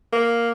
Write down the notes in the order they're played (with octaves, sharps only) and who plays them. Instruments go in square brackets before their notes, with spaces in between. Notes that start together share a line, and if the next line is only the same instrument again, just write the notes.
[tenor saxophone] A#3